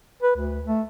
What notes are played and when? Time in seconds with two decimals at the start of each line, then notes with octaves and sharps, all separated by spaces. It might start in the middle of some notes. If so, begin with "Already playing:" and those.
0.22 B4
0.35 D2
0.65 A3